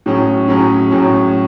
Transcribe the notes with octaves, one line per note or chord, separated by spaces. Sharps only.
A2 F#3 C#4 G#4
A2 F#3 C#4 G#4
A2 F#3 C#4 G#4